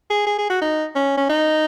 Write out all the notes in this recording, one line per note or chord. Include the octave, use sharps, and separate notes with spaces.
G#4
G#4
G#4
F#4
D#4
C#4
C#4
D#4